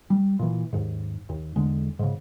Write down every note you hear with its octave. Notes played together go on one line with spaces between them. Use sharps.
G3
A#2 E3
D#2 G#2
D#2
E2 D3 G#3
G#2 C#3